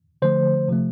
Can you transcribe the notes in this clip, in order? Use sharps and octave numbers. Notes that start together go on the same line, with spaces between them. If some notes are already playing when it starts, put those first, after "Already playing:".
D3 F3 A3 C5
C3 F3 A3